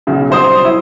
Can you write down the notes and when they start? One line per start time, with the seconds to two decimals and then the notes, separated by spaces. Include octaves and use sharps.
0.07 B1 C#3
0.29 C2 F#3 C5 D#6
0.65 E4